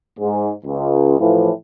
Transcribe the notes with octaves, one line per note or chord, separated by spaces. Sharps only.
G#2
C#2
A2 E3 F3